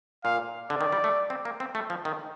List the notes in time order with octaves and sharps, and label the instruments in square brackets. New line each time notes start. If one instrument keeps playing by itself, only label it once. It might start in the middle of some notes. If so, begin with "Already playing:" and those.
[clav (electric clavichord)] A#2 [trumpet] F5
[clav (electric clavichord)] D3 [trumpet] D5
[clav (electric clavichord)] D#3
G3
A3
C4
A#3
C4
A3
F3
D#3